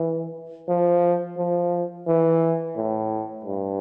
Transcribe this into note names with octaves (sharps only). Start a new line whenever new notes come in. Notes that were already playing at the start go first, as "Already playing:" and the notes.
Already playing: E3
F3
F3
E3
A2
G2